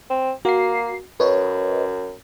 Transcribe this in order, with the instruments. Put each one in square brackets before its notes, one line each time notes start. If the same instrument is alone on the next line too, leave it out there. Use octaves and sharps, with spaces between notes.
[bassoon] C4
[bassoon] A#3 [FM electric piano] F#4 C7
[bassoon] F#2 [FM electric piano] B4 C#5 D#5